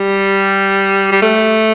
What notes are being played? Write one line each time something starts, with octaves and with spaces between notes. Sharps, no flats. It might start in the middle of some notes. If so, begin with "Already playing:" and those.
Already playing: G3
G3
A3